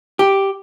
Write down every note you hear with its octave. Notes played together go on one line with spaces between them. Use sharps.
G4